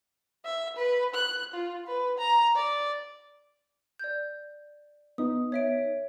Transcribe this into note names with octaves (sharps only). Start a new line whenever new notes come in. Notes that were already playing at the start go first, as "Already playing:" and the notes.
E5
B4
F#6
F4
B4
A#5
D5
D5 G6
B3 D#4 D#6
C#5 E5 D7